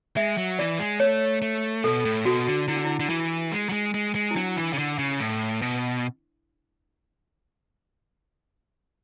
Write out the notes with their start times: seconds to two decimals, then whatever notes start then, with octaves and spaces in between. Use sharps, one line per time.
0.17 G#3 E5
0.38 F#3
0.59 E3 D5
0.79 G#3
1.00 A3 C#5
1.42 A3
1.84 B2 A4
2.05 A2
2.25 B2 F#4
2.47 D3
2.68 D3 E4
2.76 D4
2.85 E4
3.00 D3
3.09 E3
3.52 G#3
3.69 F#3
3.72 G#3
3.94 G#3
4.15 G#3
4.31 E4
4.36 F#3 D4
4.56 E3
4.73 C#3
4.78 D3
4.99 C#3
5.20 A2
5.62 B2